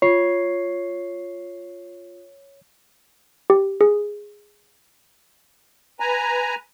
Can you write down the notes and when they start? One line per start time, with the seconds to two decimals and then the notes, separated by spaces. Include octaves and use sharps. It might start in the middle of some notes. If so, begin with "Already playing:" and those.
0.02 F4 C#5 C7
3.50 G4
3.81 G#4
6.00 B4 G#5 A#5